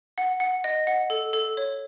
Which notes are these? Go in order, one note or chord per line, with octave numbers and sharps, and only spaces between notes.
F#5
F#5
D#5
F#5
A4
A4
C#5